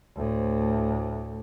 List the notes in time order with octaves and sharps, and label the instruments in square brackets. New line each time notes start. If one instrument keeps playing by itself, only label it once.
[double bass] D2 A2